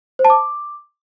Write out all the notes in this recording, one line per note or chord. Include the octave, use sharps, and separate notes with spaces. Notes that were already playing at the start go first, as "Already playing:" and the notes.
C5
A5
D6